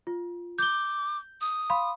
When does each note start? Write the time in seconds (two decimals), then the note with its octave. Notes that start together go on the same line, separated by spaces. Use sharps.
0.07 F4
0.59 D6 G6 G7
1.41 D#6
1.70 F5 B5 C6